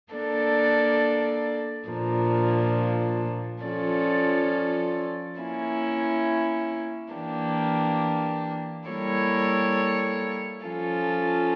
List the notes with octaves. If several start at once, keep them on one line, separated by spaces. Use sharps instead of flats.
A#3 D4 A4 D5
A#2 F3 A#3 D4
F3 C#4 F4 A4 D5
A#3 C#4 E4
E3 A#3 D4 G4
G3 A#3 E4 A4 C#5
F3 C#4 F4 A4